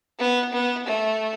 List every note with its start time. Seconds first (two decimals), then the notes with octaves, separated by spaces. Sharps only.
0.19 B3
0.52 B3
0.87 A3